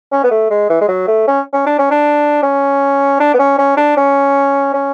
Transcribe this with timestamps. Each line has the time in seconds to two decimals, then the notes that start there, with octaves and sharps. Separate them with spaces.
0.12 C#4
0.24 B3
0.31 A3
0.50 G#3
0.70 E3
0.81 G#3
0.89 F#3
1.08 A3
1.27 C#4
1.53 C#4
1.66 D4
1.79 C#4
1.91 D4
2.43 C#4
3.20 D4
3.34 B3
3.39 C#4
3.58 C#4
3.77 D4
3.97 C#4
4.74 C#4